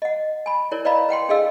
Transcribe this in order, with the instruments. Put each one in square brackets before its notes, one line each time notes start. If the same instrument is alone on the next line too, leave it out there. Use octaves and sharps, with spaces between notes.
[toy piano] D#5 F#5
G#5 B5
E4 A#4 C#5 D5
B4 D5 D#5 F5 A#5 B5
B4 F#5 G5 C6
D4 G#4 A4 D#5 F5 E6